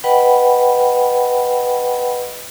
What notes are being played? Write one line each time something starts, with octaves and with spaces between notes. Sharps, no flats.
B4 D#5 F#5 G5 B5